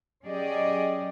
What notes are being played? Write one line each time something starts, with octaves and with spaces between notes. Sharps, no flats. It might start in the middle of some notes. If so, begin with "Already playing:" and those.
F#3 C#4 G4 G#4 D5 D#5